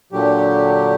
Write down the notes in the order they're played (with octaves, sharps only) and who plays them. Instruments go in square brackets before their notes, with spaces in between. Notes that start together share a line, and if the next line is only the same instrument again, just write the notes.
[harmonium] A#2 D3 F#3 G4